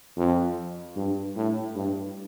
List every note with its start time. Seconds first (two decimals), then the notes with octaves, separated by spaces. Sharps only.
0.17 F2
0.96 G2
1.36 A2
1.75 G2